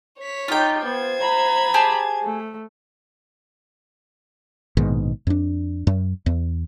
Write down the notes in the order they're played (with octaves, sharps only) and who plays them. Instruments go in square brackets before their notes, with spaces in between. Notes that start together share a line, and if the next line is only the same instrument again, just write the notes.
[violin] C#5 B6
[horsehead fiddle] D#4 G4 [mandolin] F4 G5
[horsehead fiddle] B3 [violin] C5 G#6
[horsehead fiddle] A#5 B5
[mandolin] G4 G#4 A5
[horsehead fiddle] A3
[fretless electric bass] A#1 G#2 B2 D#3
F2 D4
F#2
E2